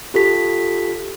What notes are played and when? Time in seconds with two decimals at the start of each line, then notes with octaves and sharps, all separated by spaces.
0.14 F4 G4 A4 B6